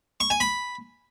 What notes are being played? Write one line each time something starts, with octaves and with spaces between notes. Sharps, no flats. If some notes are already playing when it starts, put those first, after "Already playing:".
C#6
G#5
B5